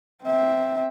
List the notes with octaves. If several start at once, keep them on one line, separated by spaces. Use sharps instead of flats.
C4 E5